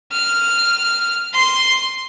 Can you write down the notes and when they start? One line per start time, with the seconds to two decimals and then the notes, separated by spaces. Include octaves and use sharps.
0.12 F6
1.33 C6